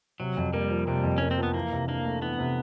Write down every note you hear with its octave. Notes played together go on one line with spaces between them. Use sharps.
C3 F#3
F2
G3 A#3
F3
C3 G3
F2
A#3 C#4
C4
F3 B3
E3 A#3
C3
A#3 D4
A3
E3 B3
C3